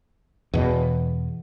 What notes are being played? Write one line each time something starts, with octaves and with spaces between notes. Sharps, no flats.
E2 B2